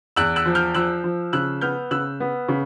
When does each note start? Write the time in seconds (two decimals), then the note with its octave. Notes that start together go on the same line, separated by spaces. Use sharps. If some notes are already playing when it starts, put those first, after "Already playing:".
0.16 E2 E6 F#6
0.36 E6 F#6
0.46 F3
0.55 F6 G6
0.74 F3 E6 F#6
1.04 F3
1.33 C#3 E6 F#6
1.61 B3 F6 G6
1.91 C#3 E6 F#6
2.20 B3
2.49 C#3